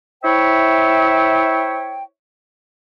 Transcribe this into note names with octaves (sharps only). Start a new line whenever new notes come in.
E4 C5 C#5 E5 G5